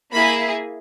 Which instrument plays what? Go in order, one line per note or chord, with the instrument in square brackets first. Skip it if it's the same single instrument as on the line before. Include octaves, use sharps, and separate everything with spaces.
[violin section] A#3 E4 G#4 B5